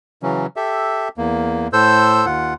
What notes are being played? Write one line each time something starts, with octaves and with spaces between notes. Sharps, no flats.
C#3 E3 F#3 C#4
G4 A4 E5
E2 A#3
A2 A4 C5 E6 G6
D#2 F4 F#5